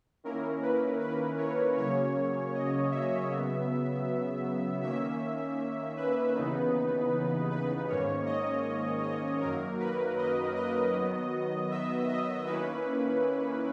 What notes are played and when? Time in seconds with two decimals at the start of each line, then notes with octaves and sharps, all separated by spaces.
0.24 D#3 A#3 C#4 E4 A#4
0.62 B4
1.01 B4
1.38 C#5
1.77 C#3 F#3 A#3 C#4 C#5
2.54 D#5
2.92 E5
3.30 C#3 F#3 B3
4.82 D#3 A#3 C#4 E5
5.97 B4
6.35 D#2 C#3 E3 B3 D#4
7.51 B4
7.88 G#2 D#3 A#3 C#4 C#5
8.26 D#5
9.03 D#5
9.41 F#2 D#3 F#3 A#3 A#4
9.80 B4
10.18 D#5
10.56 D#5
10.94 D#3 F#3 B3
11.71 E5
12.09 D#5
12.47 D#3 A#3 C#4 E4 B4